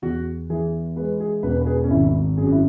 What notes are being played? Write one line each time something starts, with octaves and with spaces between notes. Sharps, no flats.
E2 F#4
E3 G#4
G#3 B4
G#4
E1 B4
B4
G#4
C#4
G#1 E4
F#2 G#4
F#4
E4